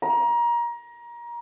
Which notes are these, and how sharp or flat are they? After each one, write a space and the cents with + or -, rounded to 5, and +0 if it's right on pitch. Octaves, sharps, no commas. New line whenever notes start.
A#5 +25